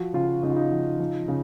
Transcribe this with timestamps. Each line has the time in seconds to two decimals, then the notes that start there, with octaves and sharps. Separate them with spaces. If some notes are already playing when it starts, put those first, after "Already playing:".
Already playing: F3 F#4
0.13 C#3 F4
0.43 C#3 D#4
0.50 F4
0.56 D#4
0.71 F3
0.99 F3
1.28 C#3